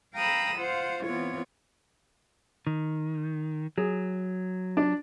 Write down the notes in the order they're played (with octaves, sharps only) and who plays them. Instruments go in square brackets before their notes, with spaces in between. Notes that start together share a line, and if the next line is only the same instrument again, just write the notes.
[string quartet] F5 G5 A#5 B5 D#6 E6
F4 C5 F5 F#5
E3 B3 C4 F4 C#5
[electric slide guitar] D#3
[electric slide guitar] F#3 [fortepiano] G#4
[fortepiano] D4